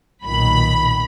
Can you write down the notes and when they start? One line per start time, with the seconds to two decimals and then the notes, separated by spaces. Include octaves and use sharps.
0.24 B1 A#2 D#3 B5